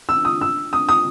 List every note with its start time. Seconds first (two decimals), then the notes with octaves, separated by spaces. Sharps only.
0.09 E6
0.25 D#6
0.41 E6
0.73 D#6
0.89 D#6